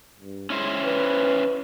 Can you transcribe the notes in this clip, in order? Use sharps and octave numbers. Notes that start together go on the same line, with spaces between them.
G2
G#3 C#4 E4 C5
B4